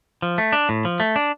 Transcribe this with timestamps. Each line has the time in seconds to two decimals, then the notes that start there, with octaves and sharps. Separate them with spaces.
0.22 F3
0.38 A3
0.52 D4
0.69 A2
0.85 F3
1.00 A3
1.16 D4